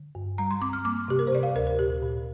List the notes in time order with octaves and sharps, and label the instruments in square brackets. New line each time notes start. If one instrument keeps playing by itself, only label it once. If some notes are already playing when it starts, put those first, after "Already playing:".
Already playing: [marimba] D3
G2
G3 A#5
C6
C4 D6
F6
A#3 D6
C3 G4
A#4
C5
C3 D5
F5
D2 A#4
A#4
A#2 G4
A#2